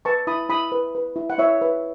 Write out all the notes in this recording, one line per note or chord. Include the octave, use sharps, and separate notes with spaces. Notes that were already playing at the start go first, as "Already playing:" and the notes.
B4 A5 C#6
E4 B5 D#6
E4 B5 D#6
B4
B4
E4
F#5
E4 C#5 E5
B4